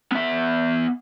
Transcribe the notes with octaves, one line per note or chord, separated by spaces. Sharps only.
B3 E5